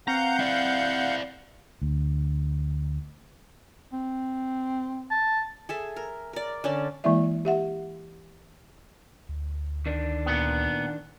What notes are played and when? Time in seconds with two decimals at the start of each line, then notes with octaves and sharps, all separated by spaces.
0.08 C4 B4 F5 F#5 A#5 G6
0.39 E4 D5
1.82 D2
3.93 C4
5.11 A5
5.69 G#4 A4 E5
5.96 A#4
6.33 A#4 D5
6.64 D3 C#4 D5 A5
7.04 E3 G#3 A#3 E4 D5 E5
7.45 G4 E5 F#5
9.29 D2
9.86 D#3 D4
10.26 A#2 B3